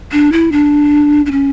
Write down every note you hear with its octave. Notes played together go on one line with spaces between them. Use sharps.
D4
E4
D4
D4
C#4